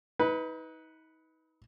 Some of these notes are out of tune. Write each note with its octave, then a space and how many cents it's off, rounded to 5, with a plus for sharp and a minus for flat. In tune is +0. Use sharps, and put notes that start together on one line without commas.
D#4 +35 B4 +0